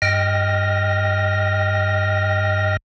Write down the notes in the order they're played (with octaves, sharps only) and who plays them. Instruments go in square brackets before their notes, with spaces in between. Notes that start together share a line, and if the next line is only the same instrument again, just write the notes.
[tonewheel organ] G2 D#5 G5 F6 A#6